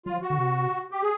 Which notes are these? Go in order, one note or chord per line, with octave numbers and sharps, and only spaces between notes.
F#3 F4
F3
F#4
D3
C3
G4
G#4